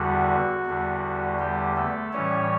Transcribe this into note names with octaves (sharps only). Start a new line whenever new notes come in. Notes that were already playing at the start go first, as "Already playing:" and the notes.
Already playing: E2 D3 G3 F#4
E2 D3 G3
G3 G4
A3 A4
A2 E3 G3 C#4 C#5